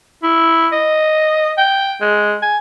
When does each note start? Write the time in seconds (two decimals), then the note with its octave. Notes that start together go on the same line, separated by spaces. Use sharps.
0.23 E4
0.72 D#5
1.58 G5
2.01 G#3
2.43 G#5